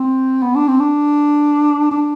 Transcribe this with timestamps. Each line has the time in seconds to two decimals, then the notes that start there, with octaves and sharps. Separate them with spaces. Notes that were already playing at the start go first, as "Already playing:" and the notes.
Already playing: C4
0.42 B3
0.55 D4
0.68 C4
0.80 D4
1.91 D4